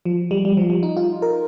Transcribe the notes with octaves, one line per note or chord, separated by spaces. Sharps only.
F3
G3
G3
F3
G3
D#4
F4
A#4